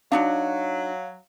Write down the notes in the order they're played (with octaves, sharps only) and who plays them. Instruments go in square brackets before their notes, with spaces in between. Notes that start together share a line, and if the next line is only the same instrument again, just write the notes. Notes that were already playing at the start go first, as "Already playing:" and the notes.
[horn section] F#3 [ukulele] D4 D#4 F#4 [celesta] F5